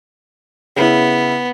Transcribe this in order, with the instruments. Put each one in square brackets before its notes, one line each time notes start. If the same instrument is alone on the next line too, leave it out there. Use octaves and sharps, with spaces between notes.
[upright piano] C#3 E4 [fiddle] B3